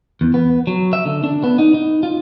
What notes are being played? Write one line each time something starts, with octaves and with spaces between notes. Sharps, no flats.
E2
B3
F#3
E5
D3
D4
B3
D#4
D#4
F4